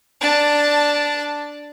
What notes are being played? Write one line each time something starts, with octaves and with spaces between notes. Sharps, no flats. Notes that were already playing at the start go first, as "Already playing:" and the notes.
D4 A5